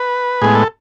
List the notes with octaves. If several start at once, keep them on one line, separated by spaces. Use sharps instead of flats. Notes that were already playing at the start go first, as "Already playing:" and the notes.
Already playing: B4
A2 G#3 B3 G#4
A4